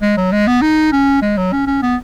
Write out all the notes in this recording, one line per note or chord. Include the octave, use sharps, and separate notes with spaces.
G#3
F#3
G#3
B3
D#4
C#4
G#3
F#3
C#4
C#4
B3